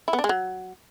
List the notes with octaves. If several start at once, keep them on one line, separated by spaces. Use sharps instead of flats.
E4
B3
D4
G#3
F#3